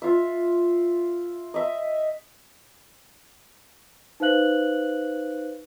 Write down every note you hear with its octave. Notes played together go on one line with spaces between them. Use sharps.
F4 E5
D#5 E5
D#4 B4 C5 F5 F#6 F#7